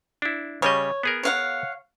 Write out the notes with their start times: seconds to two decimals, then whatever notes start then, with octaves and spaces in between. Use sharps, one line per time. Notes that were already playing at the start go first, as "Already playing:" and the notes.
0.22 D4 E4
0.62 C#3 G3 C#5 D#5
1.03 B3 G#4 A#4
1.23 C#5 F5 F#5